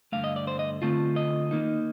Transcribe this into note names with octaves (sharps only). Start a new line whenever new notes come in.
G2 D3 A3 F5
D#5
D5
C5
D#5
D3 A3 C4 F4
D#5
D#3 A#3 D#4